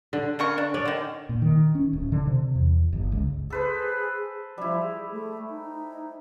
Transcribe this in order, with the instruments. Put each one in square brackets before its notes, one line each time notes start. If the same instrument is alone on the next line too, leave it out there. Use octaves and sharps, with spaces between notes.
[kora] D3
[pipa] C#3 A#4 C#6
D4
[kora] C#4 D5
[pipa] D3 D#3
[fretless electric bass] A#2
D#3
C#4
D1
D3
C3
E2
G1
C#2
[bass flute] G#4 [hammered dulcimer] A4 B4 C5
[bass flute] F3 [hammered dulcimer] G3 E4
[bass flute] G#4
A3
D#4